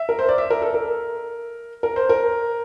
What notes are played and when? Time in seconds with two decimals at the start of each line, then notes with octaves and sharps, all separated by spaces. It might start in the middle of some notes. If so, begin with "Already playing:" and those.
Already playing: E5
0.09 A#4
0.19 C5
0.29 D5
0.38 E5
0.50 A#4
0.62 A4
0.74 A#4
1.83 A#4
1.96 C5
2.09 A#4